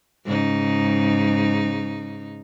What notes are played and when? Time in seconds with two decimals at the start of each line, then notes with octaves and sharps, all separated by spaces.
0.25 G#2 C#3 D#4